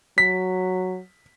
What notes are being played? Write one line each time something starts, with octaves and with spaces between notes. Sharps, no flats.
F#3 B6